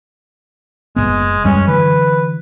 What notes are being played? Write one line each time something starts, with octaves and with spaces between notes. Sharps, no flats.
F#1 F#2 G#3 B3
F#2 G3 G#3 C#4
D3 E3 F#3 B4